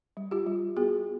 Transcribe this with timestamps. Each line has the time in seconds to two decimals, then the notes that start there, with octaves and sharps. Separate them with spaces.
0.17 G3
0.31 F4 G4
0.46 G3
0.77 B3 F#4 G#4